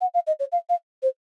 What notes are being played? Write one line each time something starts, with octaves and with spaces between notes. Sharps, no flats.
F#5
F5
D#5
C#5
F5
F5
C5